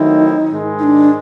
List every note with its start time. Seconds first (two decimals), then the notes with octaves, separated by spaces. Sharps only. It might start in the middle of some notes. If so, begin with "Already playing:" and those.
Already playing: D#3 F#3 A3 C4 D#4 E4
0.52 G#2 D#3 G#3
0.79 D#4
0.83 D4